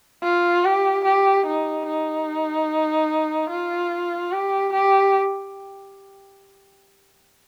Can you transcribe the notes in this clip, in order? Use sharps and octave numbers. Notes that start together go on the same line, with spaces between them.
F4
G4
G4
D#4
D#4
F4
G4
G4